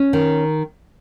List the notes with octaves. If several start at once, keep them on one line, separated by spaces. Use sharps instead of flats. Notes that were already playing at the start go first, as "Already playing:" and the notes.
Already playing: C#4
D#3